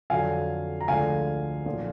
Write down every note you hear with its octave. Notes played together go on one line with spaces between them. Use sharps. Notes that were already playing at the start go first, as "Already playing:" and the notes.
F2 D3 F#3 F5 G#5
A#5
D2 D3 F3 G#3 F5 G#5
B1 A#2 F3